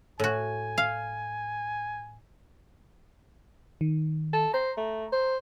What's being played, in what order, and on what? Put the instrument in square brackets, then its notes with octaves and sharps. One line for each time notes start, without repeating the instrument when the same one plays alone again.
[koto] A2 F#4 [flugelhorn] G#5
[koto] F5
[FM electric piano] D#3
[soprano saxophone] A4
[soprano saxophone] C5 [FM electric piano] A#5
[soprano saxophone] A3
C5